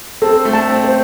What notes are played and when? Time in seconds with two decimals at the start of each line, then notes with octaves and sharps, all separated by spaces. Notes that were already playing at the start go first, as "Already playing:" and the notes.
0.22 C4 A4
0.45 A3
0.53 A5
0.69 C4
0.84 C5